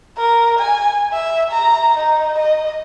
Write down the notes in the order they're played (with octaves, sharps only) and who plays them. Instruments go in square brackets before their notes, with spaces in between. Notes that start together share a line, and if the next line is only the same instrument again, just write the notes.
[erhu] A#4
G#5
E5
A#5
D#4
D#5